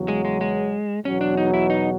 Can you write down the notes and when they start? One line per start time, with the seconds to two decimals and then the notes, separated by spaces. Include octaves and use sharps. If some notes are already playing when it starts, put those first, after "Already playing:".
Already playing: E2 C#3 F#3
0.08 G#3
0.25 G#3
0.41 G#3
1.05 E2 B2 F#3 C#4
1.21 D4
1.37 D#4
1.54 E4
1.70 D#4